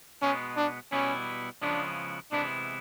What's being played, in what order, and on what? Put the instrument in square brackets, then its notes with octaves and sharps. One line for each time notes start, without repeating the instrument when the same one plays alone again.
[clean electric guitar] B2 G#3 B3 [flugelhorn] C#4
[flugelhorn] D4
[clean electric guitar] B2 G3 B3 E4 [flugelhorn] C#4
[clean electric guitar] C#3 F3 G#3 B3 E4 [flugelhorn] D4
[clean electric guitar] C3 E3 G#3 B3 E4 [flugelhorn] D4